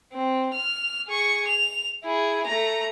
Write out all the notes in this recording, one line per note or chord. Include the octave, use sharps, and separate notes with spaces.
C4
F6
G#4 C#6
F7
E4 G#4
A3 A#5